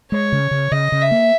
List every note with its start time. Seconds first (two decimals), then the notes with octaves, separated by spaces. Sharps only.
0.11 G#3 C#5
0.32 C#3
0.51 C#3
0.72 C#3 D#5
0.92 C#3
1.02 E5
1.11 A#3